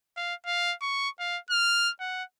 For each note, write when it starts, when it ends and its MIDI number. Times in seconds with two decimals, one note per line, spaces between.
0.17 0.34 77
0.46 0.74 77
0.82 1.09 85
1.19 1.38 77
1.50 1.91 89
2.00 2.23 78